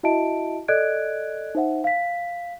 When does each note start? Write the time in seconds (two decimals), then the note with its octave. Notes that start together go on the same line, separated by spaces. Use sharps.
0.03 E4 F#4 D#5 E5 A5 D7
0.68 A4 D5 D#5 F#6 G#6 D7
1.55 D#4 C5 E5 F#5
1.84 F5 B6